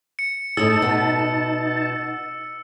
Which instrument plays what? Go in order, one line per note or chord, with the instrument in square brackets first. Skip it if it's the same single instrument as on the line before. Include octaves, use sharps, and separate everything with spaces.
[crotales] C#7
[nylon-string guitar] A2 G#4 [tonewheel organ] D#4 A5 [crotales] E6
[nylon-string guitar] B2 B3